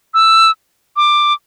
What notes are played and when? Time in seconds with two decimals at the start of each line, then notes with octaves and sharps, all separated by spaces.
0.14 E6
0.96 D6